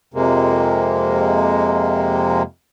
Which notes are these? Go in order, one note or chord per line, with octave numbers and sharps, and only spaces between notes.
F2 C3 G#3 A#3